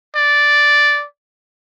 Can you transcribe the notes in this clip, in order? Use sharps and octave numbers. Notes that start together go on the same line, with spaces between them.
D5